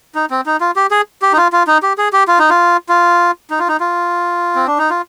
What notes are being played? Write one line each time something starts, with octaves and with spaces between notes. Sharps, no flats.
D#4
C4
D#4
F4
G4
G#4
G4
D#4
F4
F4
D#4
G4
G#4
G4
F4
D#4
F4
F4
D#4
F4
D#4
F4
C4
D4
D#4
F4